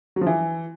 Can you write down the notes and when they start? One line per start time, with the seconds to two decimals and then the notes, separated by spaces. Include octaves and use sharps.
0.16 F#3
0.21 F3
0.27 E3